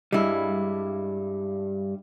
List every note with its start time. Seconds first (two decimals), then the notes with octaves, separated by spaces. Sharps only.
0.12 G2 G3 G#3 E4